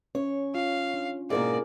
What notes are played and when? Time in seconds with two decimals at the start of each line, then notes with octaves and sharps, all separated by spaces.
0.15 C#4 C#5
0.55 F4 F5
0.94 D4
1.30 G#2 B2 A#3 E4 G#4 A#4 D5